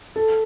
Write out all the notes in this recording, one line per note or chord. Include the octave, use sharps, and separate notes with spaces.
A4